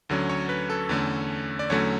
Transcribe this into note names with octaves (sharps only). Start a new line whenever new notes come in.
D2 D3 F#3 C#4
C#5
B4
A4
E2 D3 A3 C#4
D5
E2 D3 F#3 A3 C#4 C#5